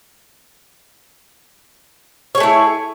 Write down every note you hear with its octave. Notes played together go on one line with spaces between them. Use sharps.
A3 E4 G#4 C#5